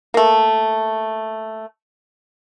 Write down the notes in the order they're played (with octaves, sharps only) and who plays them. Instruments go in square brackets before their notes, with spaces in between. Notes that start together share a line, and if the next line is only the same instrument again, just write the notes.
[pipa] A3 A#3